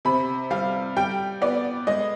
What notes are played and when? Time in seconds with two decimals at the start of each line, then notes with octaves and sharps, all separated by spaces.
0.05 C3 B5
0.50 G3 F5
0.96 G3 G5
1.42 B3 D5
1.87 G#3 D#5